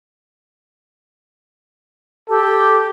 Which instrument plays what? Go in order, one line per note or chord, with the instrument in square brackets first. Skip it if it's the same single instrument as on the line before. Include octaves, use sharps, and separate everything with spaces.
[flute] G4 [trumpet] A4